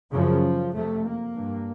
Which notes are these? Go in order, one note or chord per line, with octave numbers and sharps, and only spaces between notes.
F#2 C#3 F3
F2 C3 A3
A#3
G2